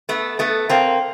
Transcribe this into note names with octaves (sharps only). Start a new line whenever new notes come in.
A3 B3
A3 B3
A#3 C4